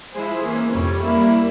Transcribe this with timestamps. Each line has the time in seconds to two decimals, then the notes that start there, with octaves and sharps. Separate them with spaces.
0.13 F3 G#3 E4 G#4 C5
0.43 E3 A#3 C#4
0.72 F2 C3 G3 C#4
1.01 G3 A#3 E4